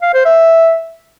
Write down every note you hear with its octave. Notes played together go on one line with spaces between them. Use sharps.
F5
C5
E5